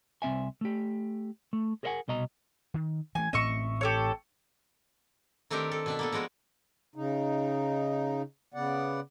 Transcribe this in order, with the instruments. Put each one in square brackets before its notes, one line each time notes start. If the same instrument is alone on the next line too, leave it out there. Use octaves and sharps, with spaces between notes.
[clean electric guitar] C2 C4 E5 G#5
A3 G4
A3
G#4 A#4 C5 E5 F#5 G#5
C2 B2 D#5 A#5
[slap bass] D#3
[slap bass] E3 A3 [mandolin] G#5
[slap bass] A1 A2 C4 [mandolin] D#5 E5 C#6
[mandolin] G4 A4 C#5
[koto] D#3 A3 C4 D4 G4 A#4
A4
B2 D4 E5
A#3 B3 A4
F3 G#3 B3 F#4 A#4
[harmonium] C#3 D#4
C#3 B3 D5 F#5